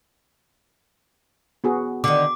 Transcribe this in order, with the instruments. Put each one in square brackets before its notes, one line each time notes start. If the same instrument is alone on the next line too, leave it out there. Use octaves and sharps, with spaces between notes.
[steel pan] B3 F#4 G#4
[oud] D3 D#3 [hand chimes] D6